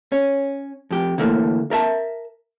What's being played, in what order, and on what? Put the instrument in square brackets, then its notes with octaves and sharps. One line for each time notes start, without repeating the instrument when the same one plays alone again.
[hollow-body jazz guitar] C#4
F2 G4
D3 E3 A3 A#3
A#4 E5 A5